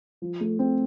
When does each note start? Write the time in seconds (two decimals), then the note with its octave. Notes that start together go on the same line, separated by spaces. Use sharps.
0.22 F3
0.41 A3
0.59 C4